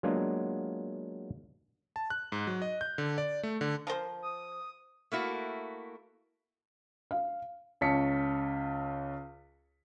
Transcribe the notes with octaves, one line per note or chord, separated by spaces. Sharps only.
F#3 G#3 A#3 B3 D4 F4
A5
F#6
G#2
F#3
D#5
G6
D3
D5
A3
D3
F3 A#4 C5
D#6
A3 A#3 E4 F#4
F5
C#2 C#4 A5 B6 C#7